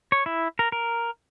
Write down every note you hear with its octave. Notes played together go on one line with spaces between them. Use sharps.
C#5
E4
A#4
A#4